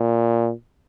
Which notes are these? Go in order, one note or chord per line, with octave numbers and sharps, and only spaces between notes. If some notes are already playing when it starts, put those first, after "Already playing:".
Already playing: A#2